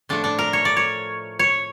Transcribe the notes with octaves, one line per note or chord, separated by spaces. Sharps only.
A2 F3 A3 D4
D4
A#4
C#5
D5
C#5
C#5